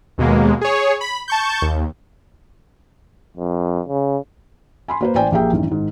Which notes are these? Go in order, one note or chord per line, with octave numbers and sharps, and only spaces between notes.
D#2 B2 G#3 A#3
G#4 C#5
B5
A5 C#6 G6
D#2
F2
C#3
G#5 B5 C6
A#3 B4 C5
A1 C5 D5 G5 G#5
A#1 A#3 G4 G#4 E5 G5
A1 F#2 D#3
G#2 D#3